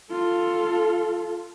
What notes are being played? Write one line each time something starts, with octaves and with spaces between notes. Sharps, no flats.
F4 A4